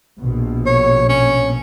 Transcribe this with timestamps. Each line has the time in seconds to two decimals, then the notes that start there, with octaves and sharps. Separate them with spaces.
0.18 A#1 B2
0.66 C#5
1.09 C#4